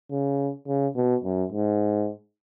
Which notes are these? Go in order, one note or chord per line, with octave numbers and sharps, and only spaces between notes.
C#3
C#3
B2
F#2
G#2